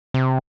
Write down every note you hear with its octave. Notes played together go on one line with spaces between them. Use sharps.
C3